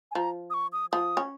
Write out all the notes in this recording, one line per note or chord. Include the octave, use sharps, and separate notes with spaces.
G#5
F3 A#5
D#6
C#6
D#6
F3 D#6
C#4